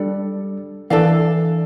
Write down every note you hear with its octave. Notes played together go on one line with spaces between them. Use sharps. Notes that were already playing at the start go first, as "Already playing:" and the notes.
Already playing: G3 D4 A4 D5
E3 D4 A4 D5 F5